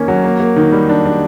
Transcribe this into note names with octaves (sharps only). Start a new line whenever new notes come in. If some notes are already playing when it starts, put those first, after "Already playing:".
Already playing: D#3 A#3 C#4
F#3
A#3
A#3
D#3
G3
D4
D4